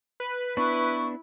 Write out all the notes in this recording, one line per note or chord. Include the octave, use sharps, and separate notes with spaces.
B4
B3 D4 E4 C#6